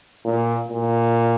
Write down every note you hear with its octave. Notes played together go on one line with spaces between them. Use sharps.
A#2
A#2